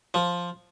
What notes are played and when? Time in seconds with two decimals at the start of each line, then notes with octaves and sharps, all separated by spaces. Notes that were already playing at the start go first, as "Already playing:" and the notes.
0.14 F3